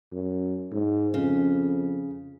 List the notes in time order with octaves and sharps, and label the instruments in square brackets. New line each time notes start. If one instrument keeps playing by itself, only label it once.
[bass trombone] F#2
G#2
[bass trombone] F2 [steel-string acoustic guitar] C#3